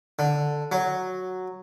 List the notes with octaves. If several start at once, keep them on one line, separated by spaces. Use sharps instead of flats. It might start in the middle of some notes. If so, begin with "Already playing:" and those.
D3
F#3